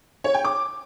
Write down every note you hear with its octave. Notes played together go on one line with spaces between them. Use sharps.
C#5
G5
D6